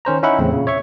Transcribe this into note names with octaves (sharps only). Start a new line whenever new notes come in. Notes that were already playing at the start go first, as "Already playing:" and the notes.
D#3 C#4 C5 A#5
C#4 D#4 E4 E5 F#5 B5
E2 A2 C#3 C4
A#2 C#3
C#5 E5 C#6